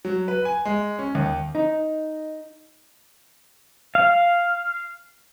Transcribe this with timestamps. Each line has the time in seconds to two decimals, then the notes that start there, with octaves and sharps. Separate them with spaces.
0.05 F#3
0.28 B4
0.45 G#5
0.65 G#3
0.99 C#4
1.15 D#2
1.55 D#4
3.95 F5